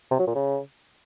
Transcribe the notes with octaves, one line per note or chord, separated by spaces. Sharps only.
C3
F#3
A#2
C#3